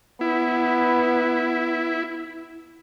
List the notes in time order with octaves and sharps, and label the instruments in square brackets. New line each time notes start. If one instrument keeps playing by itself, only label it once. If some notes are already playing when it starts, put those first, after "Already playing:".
[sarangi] B3 [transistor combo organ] E4